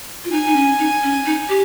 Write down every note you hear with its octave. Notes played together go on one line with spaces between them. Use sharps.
F4
D#4 G#5
D#4
C#4
D#4
C#4
D#4
G4